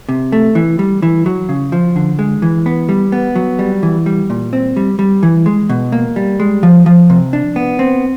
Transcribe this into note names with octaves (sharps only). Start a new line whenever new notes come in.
C3
A3
E3
G3
E3
F#3
C#3
F3
D3
G#3
E3
B3
G3
B3
F#3
G3
E3
G3
A#2
C4
G3
G3
E3
G#3
B2
A#3
G3
G#3
F3
F3
C3
D4
B3
C4